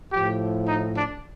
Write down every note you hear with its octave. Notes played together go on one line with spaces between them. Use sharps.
A2 F3 G4
D#4
D4